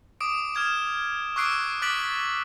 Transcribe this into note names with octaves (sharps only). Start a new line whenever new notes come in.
D6 D#6 D7
D6 F6 G#6 E7
C#6 D6 E6 F#6 C7 D7
D6 F#6 A6 B6 D7 F#7